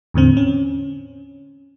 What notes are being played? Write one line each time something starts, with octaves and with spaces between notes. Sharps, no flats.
E2 A2 D3 C4
C#4